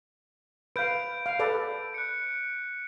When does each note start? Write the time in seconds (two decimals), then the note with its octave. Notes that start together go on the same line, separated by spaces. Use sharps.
0.76 B4 F5 G6 D7
1.26 F5
1.39 A4 B4 D5
1.94 F#6 C#7